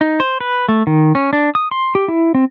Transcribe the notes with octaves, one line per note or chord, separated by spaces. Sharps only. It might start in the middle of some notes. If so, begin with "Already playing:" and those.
D#4
C5
B4
A3
D#3
C#4
D4
D#6
C6
G4
E4
C4